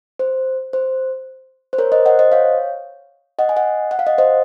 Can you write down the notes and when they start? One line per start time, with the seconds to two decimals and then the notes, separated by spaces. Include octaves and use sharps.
0.19 C5
0.73 C5
1.73 C5
1.78 A#4 C#5
1.92 C5 D#5
2.06 D#5 F#5
2.19 C5 D#5
2.32 C#5 F5
3.39 D#5 F#5
3.49 G#5
3.56 D#5 F#5
3.91 F#5
3.99 F5
4.07 D#5 F#5
4.18 C5 D#5